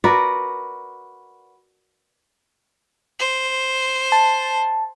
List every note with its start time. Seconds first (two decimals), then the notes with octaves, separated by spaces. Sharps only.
0.04 F#4 A#4 B4 D5
3.19 C5
4.12 A5